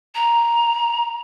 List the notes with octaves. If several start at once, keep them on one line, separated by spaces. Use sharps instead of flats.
A#5